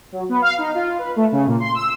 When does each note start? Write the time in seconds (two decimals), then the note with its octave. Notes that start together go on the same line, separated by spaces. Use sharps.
0.12 F#3
0.29 B3
0.42 F5
0.58 D#4
0.75 F4
0.98 B4
1.16 A3
1.32 C#3
1.47 A#2
1.60 C6
1.74 E6